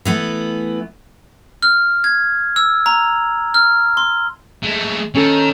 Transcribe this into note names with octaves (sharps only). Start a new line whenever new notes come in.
E3 A3 B3
F6
G#6
E6
A#5
F6
C6
G#3 A3
D#3 C#4 A4